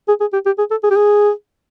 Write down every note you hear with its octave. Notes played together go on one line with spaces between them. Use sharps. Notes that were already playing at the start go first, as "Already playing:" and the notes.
G#4
G#4
G4
G4
G#4
A4
G#4
G4
G#4